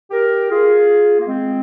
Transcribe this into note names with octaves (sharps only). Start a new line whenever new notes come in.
G4 A#4
F4 G#4
A#3
G#3 C4